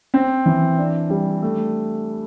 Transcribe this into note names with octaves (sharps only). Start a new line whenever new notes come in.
C4
E3
D4
G3
A3